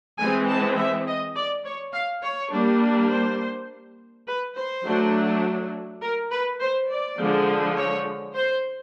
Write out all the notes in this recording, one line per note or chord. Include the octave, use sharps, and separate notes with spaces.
E3 G#3 C4 G#5
A5
E5
D#5
D5
C#5
F5
C#5
G3 A#3 D4
C5
B4
C5
F#3 A3 D4
A#4
B4
C5
D5
D3 F3 G#3
C#5
C5